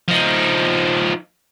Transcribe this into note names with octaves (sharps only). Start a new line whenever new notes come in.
F3 D#4